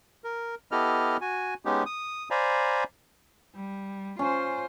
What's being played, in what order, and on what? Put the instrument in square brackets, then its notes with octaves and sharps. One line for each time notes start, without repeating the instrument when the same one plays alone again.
[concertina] A#4
B3 E4 G4 A4 D#5 F6
F#4 G#5
G#3 B3 C#4 D#4 G4
D#6
C5 D5 F5 G#5 A#5 B5
[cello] G3
[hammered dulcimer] C#4 [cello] F4 C5